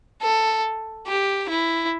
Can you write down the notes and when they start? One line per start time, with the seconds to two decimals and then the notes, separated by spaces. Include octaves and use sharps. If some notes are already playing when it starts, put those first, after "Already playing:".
0.22 A4
1.07 G4
1.49 E4